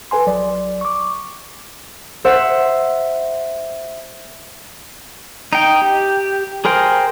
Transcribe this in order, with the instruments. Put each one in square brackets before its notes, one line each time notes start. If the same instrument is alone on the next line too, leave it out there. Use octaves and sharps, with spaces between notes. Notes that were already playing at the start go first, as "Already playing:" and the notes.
[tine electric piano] A4 B4 G#5 C6
A#1 F#3 D5
C#6 D6
[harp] C5 E5 F#5
[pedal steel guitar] D#4 G5
G4
G#4 A#4 C5 G5